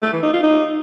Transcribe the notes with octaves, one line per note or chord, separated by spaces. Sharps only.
A3
E3
D#4
F4
D#4